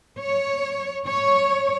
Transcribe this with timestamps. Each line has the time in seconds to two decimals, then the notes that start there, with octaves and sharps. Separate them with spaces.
0.19 C#5
1.07 C#5